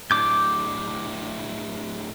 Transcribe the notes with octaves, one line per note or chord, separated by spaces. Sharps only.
A2 D4 D6 G6